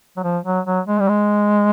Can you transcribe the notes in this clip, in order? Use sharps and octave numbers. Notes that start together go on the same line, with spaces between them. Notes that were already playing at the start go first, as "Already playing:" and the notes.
F#3
F3
F#3
F#3
G#3
G3
G#3